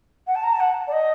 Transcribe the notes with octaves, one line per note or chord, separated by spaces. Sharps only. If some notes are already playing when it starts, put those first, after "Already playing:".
F#5
A5
A#5
A5
F#5
D5
D#5